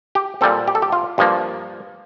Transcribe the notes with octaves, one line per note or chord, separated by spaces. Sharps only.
G4
A#2 G3 C4 A4
G4
A4
G4
F4
G2 F3 A#3